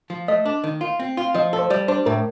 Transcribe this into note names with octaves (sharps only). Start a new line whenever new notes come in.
F3
A3 D#5
D4
D#3
F4
C4
F4
F3 D#5
A4
C5
G3 D5
D4 C5
A2 A#4